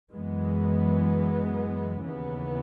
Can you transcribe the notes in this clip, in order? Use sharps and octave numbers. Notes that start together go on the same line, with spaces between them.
F#2 E3 G#3 B3
D#2 C#3 E3 B3